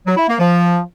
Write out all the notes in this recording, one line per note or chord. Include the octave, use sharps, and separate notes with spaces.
F#3
E4
A#3
F3